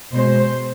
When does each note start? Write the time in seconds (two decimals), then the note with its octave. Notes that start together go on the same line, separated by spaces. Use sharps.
0.12 B2 G#3 C5